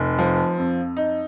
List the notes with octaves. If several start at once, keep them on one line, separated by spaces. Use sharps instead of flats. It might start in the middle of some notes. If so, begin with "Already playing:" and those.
Already playing: F1
F3
F2
D#4